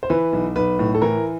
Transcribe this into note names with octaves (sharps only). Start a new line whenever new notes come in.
C5
E3 B4
B1
B1 B4
A2
A4
E3 A#4